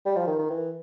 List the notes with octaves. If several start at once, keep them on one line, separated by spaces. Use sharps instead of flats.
G3
F3
D#3
D#3
E3